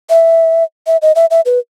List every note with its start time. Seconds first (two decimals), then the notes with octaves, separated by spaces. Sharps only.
0.10 E5
0.87 E5
1.02 D#5
1.16 E5
1.31 E5
1.46 B4